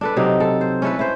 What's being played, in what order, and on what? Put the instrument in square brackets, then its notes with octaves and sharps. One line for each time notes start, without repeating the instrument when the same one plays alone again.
[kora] D4 A4 B4
C3 F#3 C4 D#4
A4
C5
C#4 E4 A4 B4
E4 C5